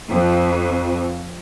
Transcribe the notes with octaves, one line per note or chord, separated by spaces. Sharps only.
F2